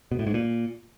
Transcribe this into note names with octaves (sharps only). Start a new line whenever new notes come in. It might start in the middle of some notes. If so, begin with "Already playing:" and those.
B2
A2
G#2
A#2